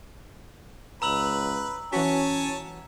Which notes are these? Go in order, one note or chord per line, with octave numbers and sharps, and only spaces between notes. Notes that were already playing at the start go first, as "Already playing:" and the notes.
C#2 B4 A#5 E6 F#7
E3 C#4 F#4 C#5 G#5 A5 B6